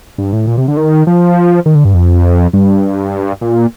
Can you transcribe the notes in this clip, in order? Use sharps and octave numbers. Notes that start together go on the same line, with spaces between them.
G2
A2
A#2
C3
D3
D#3
F3
D#3
D3
G2
F2
G2
A#2